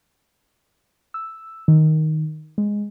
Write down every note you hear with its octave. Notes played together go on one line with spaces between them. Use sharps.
E6
D#3
G#3